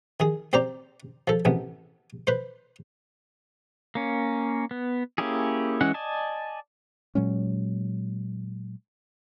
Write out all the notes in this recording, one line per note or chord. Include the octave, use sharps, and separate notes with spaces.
D#3 G#4
C4 G4 C5 D5 A#5
F3 A4
A1 C3 B3
B4 C5
A#3 C#4
B3
A#3 C#4 E4 G4 G#4
E3 G#3 C#4 F#5
D5 D#5 G#5 A5
A#2 F#3 G#3 C#4